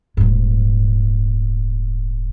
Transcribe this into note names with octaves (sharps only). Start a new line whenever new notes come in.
D#1 G#2